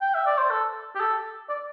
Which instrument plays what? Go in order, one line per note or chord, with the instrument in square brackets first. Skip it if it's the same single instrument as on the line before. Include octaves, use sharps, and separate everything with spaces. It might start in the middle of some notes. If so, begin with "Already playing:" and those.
[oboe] G5
E5
D5
C5
A4
G4
A4
D5